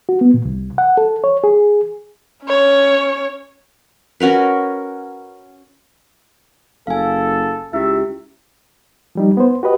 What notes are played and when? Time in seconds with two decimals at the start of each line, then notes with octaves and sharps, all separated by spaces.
0.09 F#4
0.21 B3
0.34 A#2
0.45 C2
0.78 F#5
0.97 A4
1.24 C#5
1.44 G#4
2.44 C#4 C#5
4.20 C#4 F#4 A#4 B4
6.87 F#1 A4 F5 G#5
7.73 C#2 E4 G4 E5
9.15 F3 G3 D#4
9.37 B3 C5
9.63 F#4 G4 B4 D#5